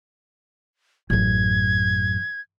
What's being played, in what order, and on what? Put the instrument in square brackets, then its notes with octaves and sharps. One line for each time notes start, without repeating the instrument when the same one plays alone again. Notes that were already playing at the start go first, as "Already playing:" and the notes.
[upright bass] A1 F#2 [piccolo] G#6